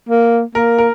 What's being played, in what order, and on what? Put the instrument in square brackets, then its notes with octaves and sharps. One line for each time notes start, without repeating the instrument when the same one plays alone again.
[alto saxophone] A#3
[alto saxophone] A#3 [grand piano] A#4
[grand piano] A#4